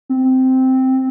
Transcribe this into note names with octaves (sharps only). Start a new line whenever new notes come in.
C4